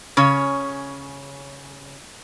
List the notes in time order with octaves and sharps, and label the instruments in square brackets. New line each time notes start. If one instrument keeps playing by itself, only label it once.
[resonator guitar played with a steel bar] C#3 C#4 C#5